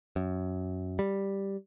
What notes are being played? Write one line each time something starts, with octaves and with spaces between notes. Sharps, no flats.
F#2
G3